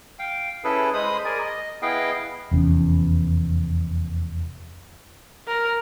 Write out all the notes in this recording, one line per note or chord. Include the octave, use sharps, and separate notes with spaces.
F5 G5
C#4 E4 G#4 A4 B4
G#3 C5 B5 D#6
G#4 A#4 D5 G#5
D#5
B3 E4 G#4 D#5 F5 G5
F1 E2 C#4
A#4